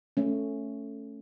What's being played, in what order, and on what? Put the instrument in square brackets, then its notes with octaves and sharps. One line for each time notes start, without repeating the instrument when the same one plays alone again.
[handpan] A3 C#4